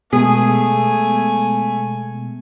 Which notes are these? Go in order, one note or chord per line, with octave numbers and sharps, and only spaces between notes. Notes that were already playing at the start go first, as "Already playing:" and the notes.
B2 G#3 A3 B3 G#4 G#5